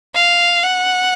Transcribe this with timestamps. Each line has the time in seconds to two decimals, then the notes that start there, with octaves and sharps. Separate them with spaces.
0.14 F5
0.64 F#5